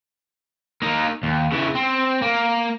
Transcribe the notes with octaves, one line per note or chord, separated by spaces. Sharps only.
A#3 D#4
D#2
C#3 E3
C4
A#3